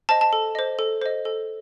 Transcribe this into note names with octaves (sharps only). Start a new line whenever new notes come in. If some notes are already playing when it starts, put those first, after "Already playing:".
C5 D#5 A5
A5
A4
C5 D#5
A4
C5 D#5
A4